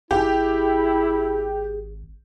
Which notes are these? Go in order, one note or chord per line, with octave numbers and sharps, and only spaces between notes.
G#1 E4 G4 G#4